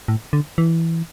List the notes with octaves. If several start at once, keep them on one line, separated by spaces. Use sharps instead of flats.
A2
D3
E3